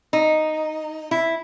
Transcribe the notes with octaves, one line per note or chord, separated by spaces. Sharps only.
D#4
E4